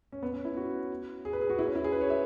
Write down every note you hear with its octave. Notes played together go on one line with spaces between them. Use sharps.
C#4
B3
C#4
E4
F#4
G#4
B4
G#4
F#4
E4
C#4
E4
G#4
B4
C#5
E5